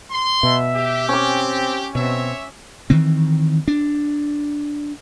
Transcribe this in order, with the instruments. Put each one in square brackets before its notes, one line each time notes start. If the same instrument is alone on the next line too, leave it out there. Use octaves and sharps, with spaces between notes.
[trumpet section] C6
[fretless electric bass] B2 [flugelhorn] E5
[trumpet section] G4
[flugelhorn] C4 [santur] C#4 D6
[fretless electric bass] B2 [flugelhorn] C4 [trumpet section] C#5 E5
[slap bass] D#3 E3 C4
D4